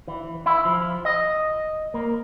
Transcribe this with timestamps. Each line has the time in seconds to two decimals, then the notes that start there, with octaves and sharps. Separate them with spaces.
0.08 E3
0.46 E4
0.65 F3
1.05 D#5
1.94 A#3